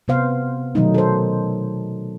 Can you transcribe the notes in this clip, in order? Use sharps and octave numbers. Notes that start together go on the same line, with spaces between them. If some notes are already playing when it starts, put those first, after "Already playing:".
C3 B3 C5 F5
B2 D#3 F#3 A3 D#4
A4 C5